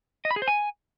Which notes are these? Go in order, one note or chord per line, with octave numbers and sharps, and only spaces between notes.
D#5
B5
G#4
C5
G#5